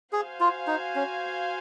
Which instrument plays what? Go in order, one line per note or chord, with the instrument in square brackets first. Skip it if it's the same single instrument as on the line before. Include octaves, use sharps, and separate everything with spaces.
[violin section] F#4 C5 F5 G#5 [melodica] G#4
[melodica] F4
D#4
C#4